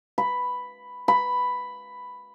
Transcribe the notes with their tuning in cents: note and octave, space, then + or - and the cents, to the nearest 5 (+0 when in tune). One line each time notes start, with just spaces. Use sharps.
B5 +5
B5 +5